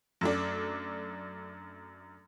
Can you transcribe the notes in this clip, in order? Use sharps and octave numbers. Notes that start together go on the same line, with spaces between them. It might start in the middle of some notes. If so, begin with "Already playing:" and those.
F#2 A3 D4